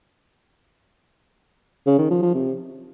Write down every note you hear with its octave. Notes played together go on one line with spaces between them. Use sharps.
C#3
D#3
F3
F3
C3